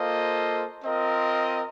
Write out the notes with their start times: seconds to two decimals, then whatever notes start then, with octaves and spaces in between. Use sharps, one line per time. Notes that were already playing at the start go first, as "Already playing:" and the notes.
Already playing: A#3 F4 A4 C5 D#5
0.84 C4 F4 A#4 D#5